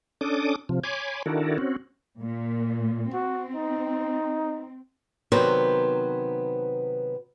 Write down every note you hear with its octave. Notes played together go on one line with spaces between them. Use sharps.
C#4 D4 A4 D6 D#6
C3 F3
C#5 G#5 B5 C6 D6
D#3 D4 E4 F#4 A4 A#4
C4 C#4 F#4
A#2
C4 F#4
D#4
C3 D#3 F#3 B3 B4 C5